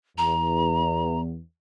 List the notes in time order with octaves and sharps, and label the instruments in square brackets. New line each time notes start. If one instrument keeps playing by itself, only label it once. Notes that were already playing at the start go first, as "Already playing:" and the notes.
[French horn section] E2 [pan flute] A#5